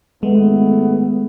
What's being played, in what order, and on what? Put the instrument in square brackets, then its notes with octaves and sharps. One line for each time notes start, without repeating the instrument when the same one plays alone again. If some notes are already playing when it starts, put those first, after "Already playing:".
[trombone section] G#1 A3 B3 [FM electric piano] G#3